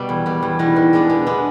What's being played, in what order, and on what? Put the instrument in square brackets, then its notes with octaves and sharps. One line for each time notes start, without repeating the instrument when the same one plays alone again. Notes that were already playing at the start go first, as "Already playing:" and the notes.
Already playing: [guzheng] B2 G3
E2
B2 G3
E2
[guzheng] B2 G3 [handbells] E4
[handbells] D#4
[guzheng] B2 [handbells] E4
[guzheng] G#3 B3 D4
B2
G#3 B3 D4